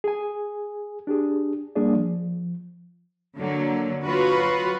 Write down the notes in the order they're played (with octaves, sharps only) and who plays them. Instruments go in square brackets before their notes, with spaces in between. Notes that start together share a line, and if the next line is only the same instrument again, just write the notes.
[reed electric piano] G#4 G#5
D4 G4 G#4
G3 A#3 D4 G#4 D5
F3
[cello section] D3 F#3 A#3
F#3 F4 F#4 B4